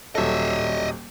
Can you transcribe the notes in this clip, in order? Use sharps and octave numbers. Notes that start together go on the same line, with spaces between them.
D#1 F#3 A4 D#5 E5